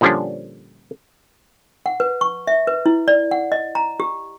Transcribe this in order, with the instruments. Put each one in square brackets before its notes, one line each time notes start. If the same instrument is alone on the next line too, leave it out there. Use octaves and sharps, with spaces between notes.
[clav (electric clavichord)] A#2 D3 F3 G3 C#4 D4
[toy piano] F#5
B4
C#6
E5
B4
E4
D5
F#5
D#5
A#5
G4